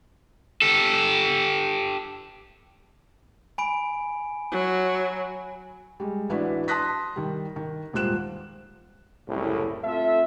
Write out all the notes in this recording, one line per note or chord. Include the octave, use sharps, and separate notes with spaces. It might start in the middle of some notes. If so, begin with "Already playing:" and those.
G4 A4
G#5 B5 D7
F#3
G3 G#3
A1 D4 E4 F#4 B4
A5 C6 D#6 F#6 A#6 B6
D#3 G3
D#3
D#1 G#2 G3 F4 F#6 E7
F#1 C2 A2
A3 C4 F4 A4 E5